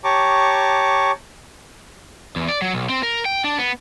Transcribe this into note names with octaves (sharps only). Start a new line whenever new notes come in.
G4 C#5 A5 A#5 C#6 D6
E2
D5
F#3
B1
C4
A#4
G5
D4
B3